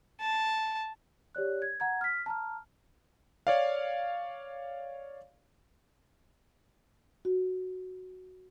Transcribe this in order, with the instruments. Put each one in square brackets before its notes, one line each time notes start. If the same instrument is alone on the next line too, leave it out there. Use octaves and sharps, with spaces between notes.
[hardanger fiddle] A5
[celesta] G4 C#5 D5 F#6
G#6
F#5 A#5 G#6
F6 B6
A5 A#5 F6
[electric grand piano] C#5 D5 F5
[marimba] F#4